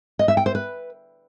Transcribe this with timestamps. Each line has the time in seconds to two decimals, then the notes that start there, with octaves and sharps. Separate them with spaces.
0.19 D#5
0.28 E5
0.37 G5
0.46 C5
0.55 B4